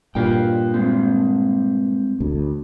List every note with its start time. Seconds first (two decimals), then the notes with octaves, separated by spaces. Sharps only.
0.15 G2 A#2 F4 G5
0.74 G#3 C4
2.20 D2